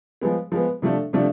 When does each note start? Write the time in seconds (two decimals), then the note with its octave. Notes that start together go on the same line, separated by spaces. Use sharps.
0.21 F3 G#3 B3
0.52 F3 G#3 B3
0.82 C3 F3 A3 D4 A4
1.13 C3 F3 A3 D4 A4